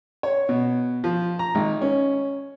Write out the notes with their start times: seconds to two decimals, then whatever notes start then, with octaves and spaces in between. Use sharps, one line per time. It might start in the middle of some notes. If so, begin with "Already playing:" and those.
0.23 C#5
0.49 B2
1.04 F3
1.39 A#5
1.55 G#1
1.82 C#4